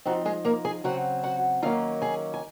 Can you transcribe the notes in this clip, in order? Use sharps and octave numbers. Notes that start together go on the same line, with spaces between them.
F3 C4 D#4 F#4
G#3 G#4
A#3 A#4
G#4 G#5
C#3 F#3 C4 F#4 F#5
F#4 F#5
D#3 F#3 A#3 C#4 F4 F5
G#4 G#5
G#5